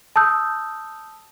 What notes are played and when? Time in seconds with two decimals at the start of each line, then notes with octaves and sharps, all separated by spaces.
0.16 A5 D#6 E6 G6